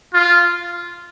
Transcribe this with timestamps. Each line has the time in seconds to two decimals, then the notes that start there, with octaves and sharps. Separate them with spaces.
0.14 F4